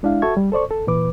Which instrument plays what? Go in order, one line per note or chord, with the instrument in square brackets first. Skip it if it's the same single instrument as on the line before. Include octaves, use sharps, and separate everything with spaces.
[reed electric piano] G#3 D4 E4 F5
F#4 A4 E5 A5 C#6 G#6
G3
A4 C5 D5 C#6
A4
A#2 E3 B4 D6